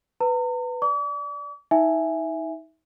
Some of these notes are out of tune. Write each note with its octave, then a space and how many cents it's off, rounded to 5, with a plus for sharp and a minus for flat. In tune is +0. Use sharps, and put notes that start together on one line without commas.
B4 +10 A#5 -40
D5 +0 D6 -45
D#4 +35 E5 +0 G#5 +0